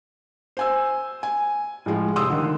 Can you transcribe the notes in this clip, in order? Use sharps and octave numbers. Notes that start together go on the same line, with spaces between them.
C5 G#5 E6
G#5
A2 F3 G#3 F4
F1 C3 C6 D#6 E6
D3 D#3